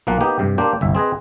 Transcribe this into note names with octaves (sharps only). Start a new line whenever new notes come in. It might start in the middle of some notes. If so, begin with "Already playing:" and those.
B1 F3 A#3 F#5
A#3 B3 D#4 G4
G2 C3
A#3 D4 G4 C5
G1 C2 E5
C4 G#4 B4 D#5